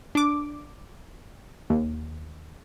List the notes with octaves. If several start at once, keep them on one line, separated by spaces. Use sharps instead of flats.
D4 D6
D#2